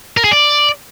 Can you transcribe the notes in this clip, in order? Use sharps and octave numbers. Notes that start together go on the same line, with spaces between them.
A#4
G#4
D5